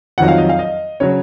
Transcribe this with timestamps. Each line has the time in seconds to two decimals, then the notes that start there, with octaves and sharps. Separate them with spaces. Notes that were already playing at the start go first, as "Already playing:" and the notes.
0.18 F2 D#3 F#3 F#5
0.28 F5
0.38 D#5
0.49 F5
0.59 D#5
1.00 C#3 F#3 C#5